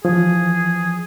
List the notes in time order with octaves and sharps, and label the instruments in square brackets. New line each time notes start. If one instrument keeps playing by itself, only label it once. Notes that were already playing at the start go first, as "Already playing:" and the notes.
[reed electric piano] E3 F3 [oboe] G#4